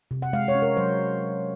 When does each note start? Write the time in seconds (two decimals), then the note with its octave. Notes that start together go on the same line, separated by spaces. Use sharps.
0.11 C3
0.22 F#5
0.33 G#3 F5
0.48 C#5
0.55 C#4
0.62 A#4
0.77 F#3 C5